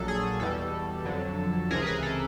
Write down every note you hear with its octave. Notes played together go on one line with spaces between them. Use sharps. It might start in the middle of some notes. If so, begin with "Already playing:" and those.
Already playing: A#1 A#2 F#3 A4
G#4
E2 B2 G3 A4
F2 D3 F#3
C#2 C3 E3 G#4 A#4
B4
G#4 A#4
A4